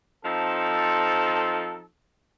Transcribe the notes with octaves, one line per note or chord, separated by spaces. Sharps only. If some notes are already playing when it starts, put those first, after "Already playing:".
F3 C4 D#4 A4